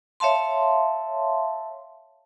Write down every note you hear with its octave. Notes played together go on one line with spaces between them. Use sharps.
C#5 E5 F5 A5 C6